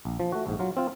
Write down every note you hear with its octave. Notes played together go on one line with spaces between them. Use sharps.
A#1
F3
A3 F#4
A#1 G#2
F#3 F4
C4 F4